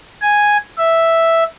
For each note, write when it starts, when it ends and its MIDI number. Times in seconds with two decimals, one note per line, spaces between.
0.22 0.58 80
0.78 1.44 76